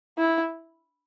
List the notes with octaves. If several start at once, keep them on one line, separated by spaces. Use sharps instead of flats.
E4